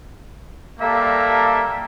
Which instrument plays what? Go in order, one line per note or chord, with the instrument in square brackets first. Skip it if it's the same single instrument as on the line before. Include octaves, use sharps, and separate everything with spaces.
[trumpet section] G3 A#3 A4 E5 F5 A#5